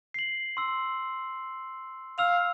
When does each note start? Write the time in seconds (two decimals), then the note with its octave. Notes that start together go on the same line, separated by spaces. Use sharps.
0.14 C7 F#7
0.57 C6 E6
2.18 F5 E6 F7